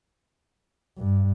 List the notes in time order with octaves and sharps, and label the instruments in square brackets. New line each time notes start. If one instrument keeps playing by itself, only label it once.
[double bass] G2